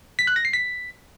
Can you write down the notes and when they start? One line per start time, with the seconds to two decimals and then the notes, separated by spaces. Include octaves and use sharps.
0.19 B6
0.27 F#6
0.36 A#6
0.45 C7
0.53 B6